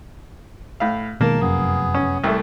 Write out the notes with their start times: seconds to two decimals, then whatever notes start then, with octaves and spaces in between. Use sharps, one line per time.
0.80 A2 F5
1.21 B2 D#3 G#3 A#3 A#4 A5
1.41 F1 F#2 B3 G#4
1.94 C#4
2.24 C2 A3